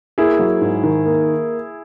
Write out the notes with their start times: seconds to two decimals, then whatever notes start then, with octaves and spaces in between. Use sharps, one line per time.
0.18 A#3 E4 G#4
0.39 F#3
0.61 G#2
0.84 D#3
1.06 A#3